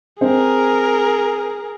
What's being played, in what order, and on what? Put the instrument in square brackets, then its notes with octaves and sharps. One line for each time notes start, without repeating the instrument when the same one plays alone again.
[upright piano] C4 [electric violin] G#4 A#4